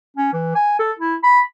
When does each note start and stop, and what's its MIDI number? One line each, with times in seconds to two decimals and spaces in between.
0.17 0.30 61
0.33 0.50 52
0.55 0.74 80
0.79 0.92 69
0.99 1.15 64
1.23 1.41 83